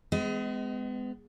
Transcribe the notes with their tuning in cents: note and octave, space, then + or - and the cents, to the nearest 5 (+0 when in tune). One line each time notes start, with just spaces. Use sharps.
G#3 +0 B3 +40 D#5 +25